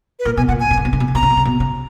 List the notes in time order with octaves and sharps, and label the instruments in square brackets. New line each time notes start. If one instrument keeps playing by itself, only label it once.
[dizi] B4
[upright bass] A#2 [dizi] A#4
[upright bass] B2 [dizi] G#5
[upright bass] A#2 [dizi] F#5
[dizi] G#5
[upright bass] B2
C#3
B2
C#3
B2
C#3
[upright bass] B2 [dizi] A#5
[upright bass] C#3
B2
C#3
B2
C#3